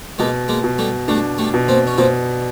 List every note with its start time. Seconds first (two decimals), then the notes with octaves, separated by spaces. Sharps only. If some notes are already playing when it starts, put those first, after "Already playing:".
0.18 B2 G#3 A#3
0.48 G#3 A#3
0.64 B2
0.78 G3 A3
1.08 G3 A3 D4
1.38 G3 A3
1.53 B2
1.68 A#3 C4
1.87 C#4
1.98 B2 A#3 C4